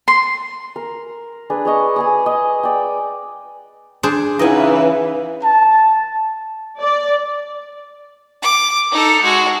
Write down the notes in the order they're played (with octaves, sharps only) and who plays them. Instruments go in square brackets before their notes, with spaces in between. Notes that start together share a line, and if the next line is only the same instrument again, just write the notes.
[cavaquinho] C6
[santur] A#4
D4 G#4 B4
G#4 C#5 D#5 C#6
G#4 G#5 D#6
D#5
D5 G5
[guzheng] D4 G#4 C5
[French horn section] C#3 E3 [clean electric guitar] D#4 E4 F#5 [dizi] B4 [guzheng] D#5 G#5
[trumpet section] A5
[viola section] D5
[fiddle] D6
D#4 A4
G#3 F#4